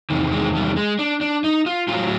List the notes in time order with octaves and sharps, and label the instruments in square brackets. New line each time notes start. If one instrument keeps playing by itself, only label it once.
[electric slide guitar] E2 C3 D#3
G#3
G3
G#3
D4
D4
D#4
F4
A2 F#3 F4